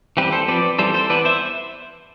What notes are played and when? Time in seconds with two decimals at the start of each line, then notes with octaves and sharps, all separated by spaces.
0.17 E3 G3 C4 G4 B4
0.32 A4 C5
0.48 F3 C4 B4 D5
0.79 E3 G3 C4 A4 C5
0.94 A4 C5
1.10 E3 B3 B4 D5
1.25 C5 E5